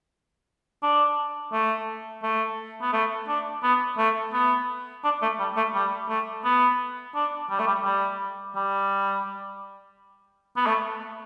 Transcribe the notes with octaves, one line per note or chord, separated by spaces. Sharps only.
D4
A3
A3
B3
A3
D4
B3
A3
B3
D4
A3
G3
A3
G3
A3
B3
D4
G3
A3
G3
G3
G3
B3
A3